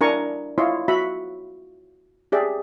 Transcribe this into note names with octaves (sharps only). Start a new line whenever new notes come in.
D4 E4 A#4 G#5 A#5 C#6
E4 F4 C#5 D#5 C6
F#4 E5 B5
G4 G#4 D5 E5